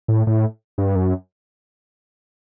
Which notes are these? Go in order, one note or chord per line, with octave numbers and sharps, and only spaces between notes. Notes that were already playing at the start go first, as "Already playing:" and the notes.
A2
A2
G2
F#2